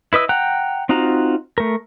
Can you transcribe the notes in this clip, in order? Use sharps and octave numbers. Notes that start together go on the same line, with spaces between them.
E4 B4 D#5 E6
F#5 G5 A#5 F#6
C4 D#4 F4 F#4 A#5
A3 A#4